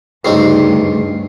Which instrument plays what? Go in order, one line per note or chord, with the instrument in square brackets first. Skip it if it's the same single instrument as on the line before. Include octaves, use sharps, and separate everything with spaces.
[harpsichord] A1 C#3 C4 [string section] D2 G2 [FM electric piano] D#4 C7